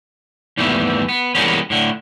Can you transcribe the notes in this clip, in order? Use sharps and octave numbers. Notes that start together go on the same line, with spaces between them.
D#2 G#2 E3 G3 A3 B3
B3
E3 G3 G#3 A#3 B3 C#4
A2 D3